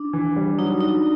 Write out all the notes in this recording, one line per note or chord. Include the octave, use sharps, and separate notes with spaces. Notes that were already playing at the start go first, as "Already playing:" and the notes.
Already playing: D4
E3
G3
F#3 D#4
D4 D#4